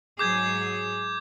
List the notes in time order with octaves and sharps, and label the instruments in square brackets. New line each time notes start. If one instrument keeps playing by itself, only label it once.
[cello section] G#2 F#3 G#4 [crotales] D6 G6 G#6